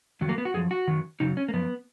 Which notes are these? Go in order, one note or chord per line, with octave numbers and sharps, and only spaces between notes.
F2 D#3 F#3
A#3
B3
F#4
F#2 F3 G#4
F#4
F#2 D#3 F#3
F#2 C#3 F#3 D#4
C#4
A#3
F#2 F3 B3